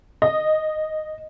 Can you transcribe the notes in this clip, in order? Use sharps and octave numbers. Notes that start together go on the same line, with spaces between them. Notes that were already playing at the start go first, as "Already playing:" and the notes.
D#5